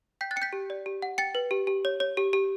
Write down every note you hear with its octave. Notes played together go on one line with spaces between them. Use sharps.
G5 G6 B6
F#6 A6
G5 C#7
G6 B6
G4
D5
G4
F#5
G5 A6 C#7
B4
G4
G4
C#5
C#5
G4
G4